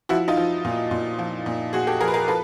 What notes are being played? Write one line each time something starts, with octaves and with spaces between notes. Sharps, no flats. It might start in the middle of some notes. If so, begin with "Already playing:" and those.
F3 E4 F#4
D#4 F4
F3
A#2
A#2
F3
A#2
A#2 F#4 G#4
G4 A4
F3 G#4 A#4
B4
G#4 A#4
F3 A4 B4